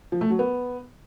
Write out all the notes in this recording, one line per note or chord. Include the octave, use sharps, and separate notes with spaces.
F3
A3
F#3
B3